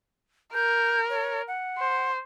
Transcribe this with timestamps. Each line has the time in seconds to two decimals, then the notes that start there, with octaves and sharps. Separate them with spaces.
0.54 A#4 G6
1.09 C#5
1.48 F#5
1.78 C5